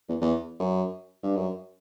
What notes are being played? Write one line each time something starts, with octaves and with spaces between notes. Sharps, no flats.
E2
E2
F#2
G2
F#2